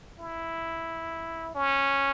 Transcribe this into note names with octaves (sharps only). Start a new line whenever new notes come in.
E4
C#4